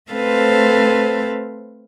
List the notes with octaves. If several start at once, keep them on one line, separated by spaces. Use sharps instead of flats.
A3 C4 A4 B4 C5 F5